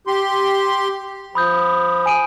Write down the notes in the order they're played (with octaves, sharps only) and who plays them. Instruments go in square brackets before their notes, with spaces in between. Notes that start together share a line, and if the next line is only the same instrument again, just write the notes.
[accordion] G4 C6
[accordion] F3 [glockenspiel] B5 D#6 G6
[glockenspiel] G#5 D7 D#7